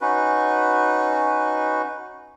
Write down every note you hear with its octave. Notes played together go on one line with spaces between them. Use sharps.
C#4 D#4 F#4 B4